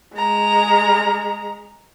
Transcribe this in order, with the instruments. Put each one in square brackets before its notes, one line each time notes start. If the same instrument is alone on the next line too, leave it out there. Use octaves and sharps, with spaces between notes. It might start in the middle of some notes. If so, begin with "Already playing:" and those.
[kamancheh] G#3 A#5